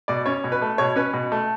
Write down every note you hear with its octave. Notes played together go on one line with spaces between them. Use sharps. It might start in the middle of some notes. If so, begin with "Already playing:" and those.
B2 D5
C#4 C#5
B2
B4
A3
B2 C#5
C#4 B4
B2
A3